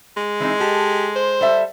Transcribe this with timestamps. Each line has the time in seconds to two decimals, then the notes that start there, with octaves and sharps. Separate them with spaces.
0.17 G#3
0.40 E3 C4 D#4
0.60 G4 A4
1.16 C5
1.41 G3 A4 E5